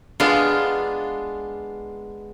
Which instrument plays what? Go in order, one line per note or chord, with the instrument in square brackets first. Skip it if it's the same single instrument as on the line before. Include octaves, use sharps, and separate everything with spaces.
[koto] G#3 B3 D4 F4